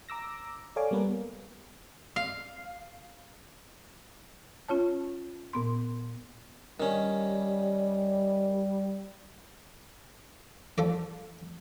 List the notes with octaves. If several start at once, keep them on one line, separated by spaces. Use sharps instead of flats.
A#5 D6 E6 A#6
A4 C#5 D5 F5 G#5 D6
G3 A#3 B3 A#4 B4
F5
C#4 F4 C#5 A5
A#2 B3 C6
D#3 G3 C#4
F3 A4 D5